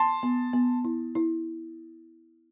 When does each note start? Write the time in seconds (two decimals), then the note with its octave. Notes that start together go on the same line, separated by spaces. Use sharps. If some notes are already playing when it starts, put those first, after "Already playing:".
Already playing: A5 C6
0.23 B3
0.53 B3
0.85 E4
1.15 E4